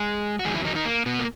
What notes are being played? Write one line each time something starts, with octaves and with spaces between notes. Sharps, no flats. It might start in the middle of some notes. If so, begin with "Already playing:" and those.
Already playing: G#3 G#4
F#4
E2 D#3 F#3 G#3 G#4
E3 E4
D#3 D#4
D#3 D#4
A#3
B2 B3
A#3